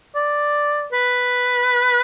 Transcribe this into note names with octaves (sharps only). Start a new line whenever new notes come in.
D5
B4